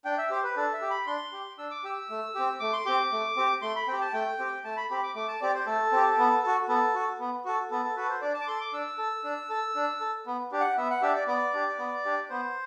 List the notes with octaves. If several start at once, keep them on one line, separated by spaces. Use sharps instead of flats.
D4 G5
E5
G4 C5
B4
D4 A4
E5
G4
B5
D4 C6
G4
D4 E6
D6
G4 E6
A3
C4 G4
A3 D6
C6
C4 G4 D6
A3
C4 G4
A3 C6
B5
C4 G4 G5
A5
A3 G5
C4 G4
A3 A5
B5
C4 G4 B5
D6
A3 D6
A5
C4 G4 D5
C5
A3 A4
C4 G4
B3
F#4 A4
B3 A4
F#4 A4
B3
F#4 A4
B3 A4
A4
F#4 A4 B4
C5
D4 D5
A5
D6
A4 C6
D6
D4 E6
A4
D4
A4
D4
A4
B3
D4 G4
F#5
B3 E5
F#5
D4 G4 E5
D5
B3 D5
D4 G4
B3
D4 G4
B3 C5